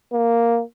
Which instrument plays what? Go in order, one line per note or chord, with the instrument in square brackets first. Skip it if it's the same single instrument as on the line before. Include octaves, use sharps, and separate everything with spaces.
[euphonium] A#3